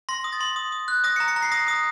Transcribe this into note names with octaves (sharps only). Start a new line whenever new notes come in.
C6 A#6
D#6
A6
C6
D#6
D#6
F#6
D#6 A#6
C#7
A#5
C#7
A#5
C7
D#6 A#6
D#6